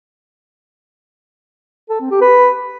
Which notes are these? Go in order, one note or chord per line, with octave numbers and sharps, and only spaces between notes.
A4
C4
G4
B4